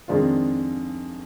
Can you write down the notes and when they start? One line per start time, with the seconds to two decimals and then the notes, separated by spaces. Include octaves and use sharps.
0.08 F2 D#3 G#3 D4 F4